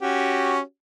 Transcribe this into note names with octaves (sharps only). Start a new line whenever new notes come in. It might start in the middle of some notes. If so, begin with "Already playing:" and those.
C#4 F#4 G4